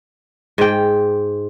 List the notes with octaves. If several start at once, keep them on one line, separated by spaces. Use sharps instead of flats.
G#2 G5